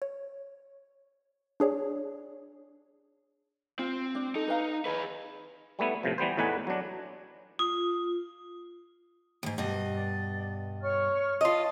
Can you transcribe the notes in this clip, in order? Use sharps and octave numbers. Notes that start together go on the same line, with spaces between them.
C#5
D4 G#4 C#5 D5
C4 F4
D4
D#4 A4
B4 F5 A#5
G#4 B4 D#5
G3 A3 B3 E4
A2 C3 F3
E3 G3 B3 C5
E2 A2 D#4 B4 F#5 G#5
F#3 D4
F4 D#6
D#2 G#2
G2 B2 D#5
D5
C#5 C#6 F6
F4 D#5 A5